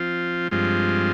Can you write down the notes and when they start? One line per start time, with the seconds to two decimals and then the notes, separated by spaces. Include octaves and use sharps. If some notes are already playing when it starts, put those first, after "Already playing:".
Already playing: F3 C4 F4
0.51 G2 F3 G#3 C4 F4